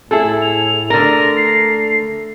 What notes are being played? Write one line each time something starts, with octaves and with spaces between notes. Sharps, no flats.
A2 E4 G#4 A4
F7
D3 A3 A#4 A#6
C7